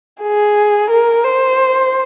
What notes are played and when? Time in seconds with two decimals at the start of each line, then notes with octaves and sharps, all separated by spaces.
0.22 G#4
0.90 A#4
1.24 C5